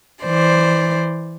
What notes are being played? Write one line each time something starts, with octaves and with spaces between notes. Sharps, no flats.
E3 C5 D5